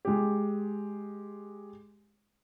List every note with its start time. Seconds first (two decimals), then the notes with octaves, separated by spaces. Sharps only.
0.05 G#3 G4